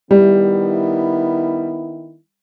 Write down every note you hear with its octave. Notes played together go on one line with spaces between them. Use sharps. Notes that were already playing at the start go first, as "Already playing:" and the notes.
D#3 G3 B3 E4